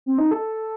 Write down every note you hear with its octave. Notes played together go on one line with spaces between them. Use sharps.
C4
D#4
A4